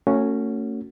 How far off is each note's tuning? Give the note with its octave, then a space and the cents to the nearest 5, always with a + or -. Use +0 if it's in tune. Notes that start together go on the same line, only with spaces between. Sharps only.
A3 +35 C#4 +0 F#4 -10